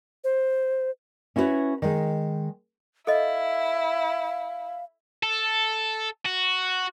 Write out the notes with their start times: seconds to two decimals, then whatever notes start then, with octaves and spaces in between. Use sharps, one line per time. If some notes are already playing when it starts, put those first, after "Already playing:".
0.24 C5
1.36 C#4 E4 F#4 G#4 B4 C#5
1.82 D#3 G#3
3.07 E4 A4 D#5 F5
5.23 A4
6.25 F#4